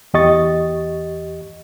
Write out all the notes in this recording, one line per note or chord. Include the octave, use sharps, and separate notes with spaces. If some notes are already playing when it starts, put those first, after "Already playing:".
E2 G4 D#5 C#6 A6